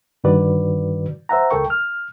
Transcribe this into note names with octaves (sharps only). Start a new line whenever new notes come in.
G2 D3 D#3 F#4 B4 D5
C5 E5 F#5 A#5
C#2 A4 A#4 G5 C#6
F6